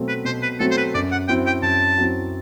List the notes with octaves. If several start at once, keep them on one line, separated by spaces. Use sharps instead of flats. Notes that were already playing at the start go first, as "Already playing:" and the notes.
Already playing: B2 F#3 A3 C4
B4
B2 C5
B4
F#3 A3 C4 A4
C5
B4
F#2 D5
F#5
F#3 C4 E4 G5
G5
F#2 A5
F#3 C4 E4